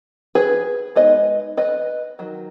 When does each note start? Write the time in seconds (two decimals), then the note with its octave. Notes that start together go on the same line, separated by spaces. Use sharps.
0.35 G#4 B4
0.95 G#3 B3 D#4 B4 D#5
1.57 B4 D#5
2.19 D#3 F#3